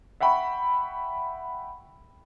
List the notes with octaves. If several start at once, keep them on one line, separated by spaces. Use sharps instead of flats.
E5 F#5 G5 B5 C#6